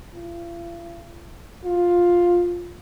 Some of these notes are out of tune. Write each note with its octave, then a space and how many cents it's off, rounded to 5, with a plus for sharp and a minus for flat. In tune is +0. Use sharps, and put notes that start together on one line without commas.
F4 -45
F4 +10